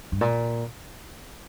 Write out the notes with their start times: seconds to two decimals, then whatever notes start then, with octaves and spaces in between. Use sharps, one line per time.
0.12 G2
0.21 A#2